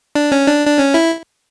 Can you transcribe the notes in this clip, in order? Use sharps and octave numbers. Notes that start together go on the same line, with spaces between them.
D4
C#4
D4
D4
C#4
E4